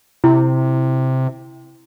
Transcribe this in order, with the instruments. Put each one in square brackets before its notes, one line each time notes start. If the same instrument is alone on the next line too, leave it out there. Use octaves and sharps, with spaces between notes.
[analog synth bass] C3 [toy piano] E4